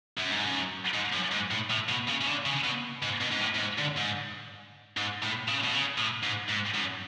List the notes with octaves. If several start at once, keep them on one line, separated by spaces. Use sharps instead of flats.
F#2
G#2
F#2
G#2
F#2
G#2
A2
A2
B2
C#3
C#3
D3
C#3
B2
G#2
B2
G#2
A2
A2
G#2
D3
G#2
G#2
A2
C#3
B2
C#3
A2
G#2
G#2
F#2